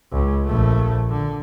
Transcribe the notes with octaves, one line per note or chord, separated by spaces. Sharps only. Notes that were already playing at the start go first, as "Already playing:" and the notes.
C#2
A#1 A3
D3